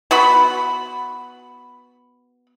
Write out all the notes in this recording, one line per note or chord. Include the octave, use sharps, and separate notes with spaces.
B3 F#4 B5